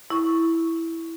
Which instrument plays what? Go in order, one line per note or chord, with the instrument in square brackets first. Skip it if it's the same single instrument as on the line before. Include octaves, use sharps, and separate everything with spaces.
[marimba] E4 C#6